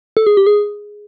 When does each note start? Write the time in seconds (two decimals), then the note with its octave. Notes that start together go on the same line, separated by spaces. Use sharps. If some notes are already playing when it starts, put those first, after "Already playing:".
0.17 A4
0.27 G#4
0.37 G4
0.47 G#4